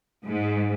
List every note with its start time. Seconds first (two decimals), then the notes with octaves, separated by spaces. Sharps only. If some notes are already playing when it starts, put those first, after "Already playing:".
0.25 G#2